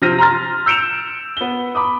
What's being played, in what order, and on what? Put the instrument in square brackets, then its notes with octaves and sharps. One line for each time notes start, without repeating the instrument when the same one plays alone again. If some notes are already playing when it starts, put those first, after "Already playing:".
[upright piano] C3 F3 C4 F6 A#6 D#7
A#5 C6 F6 A6
E6 G6 C#7 D7 E7 F7
B3 G7
B5 D6 D#6